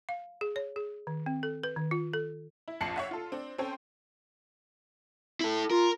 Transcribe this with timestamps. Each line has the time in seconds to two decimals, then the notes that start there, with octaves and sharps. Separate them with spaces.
0.09 F5
0.41 G#4
0.56 C#5
0.76 G#4
1.07 D#3
1.26 C4
1.43 A4
1.64 B4
1.77 D#3
1.91 F4
2.14 A4
2.68 E4
2.81 A#1 F2 A5 C7 C#7 F#7
2.96 C#5 E5 F#5
3.11 F4 A4
3.32 C4 D4
3.58 C4 C#4 A4 C5 G5
5.41 E4 A4
5.71 F4 A#4